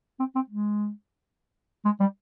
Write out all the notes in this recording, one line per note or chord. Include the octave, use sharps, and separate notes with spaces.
C4
C4
G#3
G#3
G3